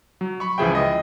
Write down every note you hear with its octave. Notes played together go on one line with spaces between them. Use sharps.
F#3
B5 C#6
C#2 E3 F3 G#4 E5 G5
D#5